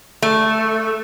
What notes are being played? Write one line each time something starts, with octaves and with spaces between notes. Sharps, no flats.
A3